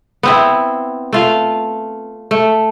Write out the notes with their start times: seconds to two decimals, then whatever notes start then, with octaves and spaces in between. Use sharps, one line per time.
0.23 B3 C4 E4
1.13 A3 F4 F5
2.31 A3